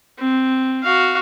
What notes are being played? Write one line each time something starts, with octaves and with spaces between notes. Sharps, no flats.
C4
F#4 F5